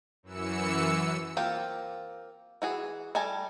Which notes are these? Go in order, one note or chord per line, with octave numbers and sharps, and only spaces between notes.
F#2 E3 E6 C#7
A#3 C4 F4 G4
E3 F#4 G#4
G3 A4 G#5 A#5